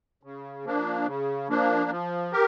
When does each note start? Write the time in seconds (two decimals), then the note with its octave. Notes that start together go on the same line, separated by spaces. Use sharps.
0.23 C#3
0.65 F3 A#3 D4
1.06 C#3
1.49 F3 A#3 D4
1.91 F3
2.32 G4 A#4